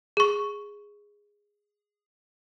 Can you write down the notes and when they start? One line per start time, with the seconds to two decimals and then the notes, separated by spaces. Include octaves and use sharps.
0.17 G#4 C#6